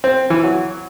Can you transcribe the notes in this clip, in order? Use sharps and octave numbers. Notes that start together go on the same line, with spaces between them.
C4
E3
F#3